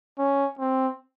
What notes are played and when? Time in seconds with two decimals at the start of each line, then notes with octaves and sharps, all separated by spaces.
0.18 C#4
0.59 C4